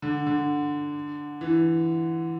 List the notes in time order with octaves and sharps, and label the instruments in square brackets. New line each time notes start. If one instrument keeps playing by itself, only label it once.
[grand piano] D3
D3
E3